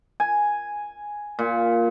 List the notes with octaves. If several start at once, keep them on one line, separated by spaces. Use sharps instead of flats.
G#5
A#2